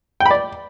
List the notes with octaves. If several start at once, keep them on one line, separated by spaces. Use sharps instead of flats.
G5
B5
D5